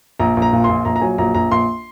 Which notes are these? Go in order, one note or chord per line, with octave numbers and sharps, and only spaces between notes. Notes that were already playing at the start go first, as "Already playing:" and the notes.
A#1 A#5
A#1
A#5
A#2
A#1 C6
A#1 A#5
A#5
F#3 G#5
A#1 A#5
A#1 A#5
A#1 C6